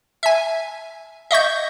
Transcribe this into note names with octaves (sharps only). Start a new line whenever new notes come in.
E5 G#5
D#5 E5 C#6 G6